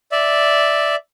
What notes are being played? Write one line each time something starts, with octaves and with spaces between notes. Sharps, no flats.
D5 E5